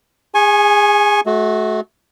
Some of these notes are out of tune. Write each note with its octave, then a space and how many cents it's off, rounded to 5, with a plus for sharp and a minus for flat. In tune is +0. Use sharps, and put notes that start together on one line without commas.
G#4 -30 G#5 +10 C#6 -25
A3 -35 F#4 +0